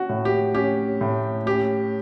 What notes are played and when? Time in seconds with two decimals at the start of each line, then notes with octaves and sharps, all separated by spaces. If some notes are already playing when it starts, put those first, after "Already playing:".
Already playing: C#4 F#4
0.09 A2
0.25 G4
0.55 C#4 G4
1.01 A2
1.46 C#4 G4